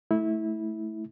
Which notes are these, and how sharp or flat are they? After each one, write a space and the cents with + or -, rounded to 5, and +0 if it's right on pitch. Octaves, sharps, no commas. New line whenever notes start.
A3 -10 E4 -20